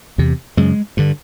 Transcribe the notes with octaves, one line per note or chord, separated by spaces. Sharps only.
E2 C3
F#2 C#3 G#3
G2 D3